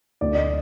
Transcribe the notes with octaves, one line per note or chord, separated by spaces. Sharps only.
D2 D5
D#5